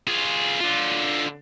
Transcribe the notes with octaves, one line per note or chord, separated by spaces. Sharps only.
F4 G#4
D3 F4